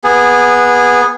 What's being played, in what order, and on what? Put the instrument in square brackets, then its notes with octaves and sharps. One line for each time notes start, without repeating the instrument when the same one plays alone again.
[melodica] B3 G#4